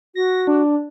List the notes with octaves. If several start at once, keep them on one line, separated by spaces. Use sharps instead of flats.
F#4 A#6
D4